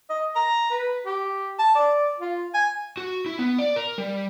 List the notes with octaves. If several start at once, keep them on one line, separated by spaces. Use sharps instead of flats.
D#5
A#5
B4
G4
A5
D5
F4
G#5
F#4
E4
B3
D5
A#4
G3